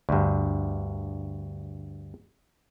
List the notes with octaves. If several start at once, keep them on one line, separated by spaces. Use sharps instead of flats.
D2 G2